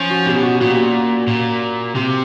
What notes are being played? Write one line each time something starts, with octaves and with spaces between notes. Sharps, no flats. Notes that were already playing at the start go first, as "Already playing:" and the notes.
Already playing: F3 C#4
F#4
B2 G4
F#4 G4
A#2 F#4
A#2
C3 G4